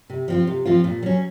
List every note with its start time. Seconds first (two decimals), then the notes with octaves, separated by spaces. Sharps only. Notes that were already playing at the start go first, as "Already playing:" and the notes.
0.10 C3
0.28 F3 C4 F4
0.47 C3
0.65 F3 C4 F4
0.84 A#2
1.03 F#3 C#4